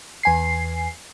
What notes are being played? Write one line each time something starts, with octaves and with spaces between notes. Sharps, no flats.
E2 G#5 C7